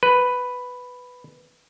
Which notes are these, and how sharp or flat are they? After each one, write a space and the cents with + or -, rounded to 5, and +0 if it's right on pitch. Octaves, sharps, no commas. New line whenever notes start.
B4 +5